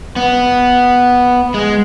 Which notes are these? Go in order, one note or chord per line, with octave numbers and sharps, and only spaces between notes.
B3
G#3